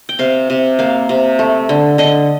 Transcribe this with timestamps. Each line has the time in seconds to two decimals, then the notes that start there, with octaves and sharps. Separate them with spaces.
0.09 G5
0.19 C3 F5
0.50 C3
0.79 A#3 F5
1.09 C3
1.39 A3
1.69 D3
1.98 D3 D#5